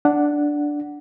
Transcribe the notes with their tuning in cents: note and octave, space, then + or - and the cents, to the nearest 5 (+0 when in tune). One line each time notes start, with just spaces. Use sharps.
D4 +0 F#5 +0